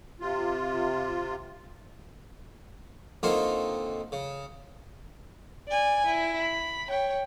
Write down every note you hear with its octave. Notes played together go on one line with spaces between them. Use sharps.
C3 F4
D3 A#3 C4 D#4 F4 C#5
C#3
D5 G#5
E4
B5
C#5 G5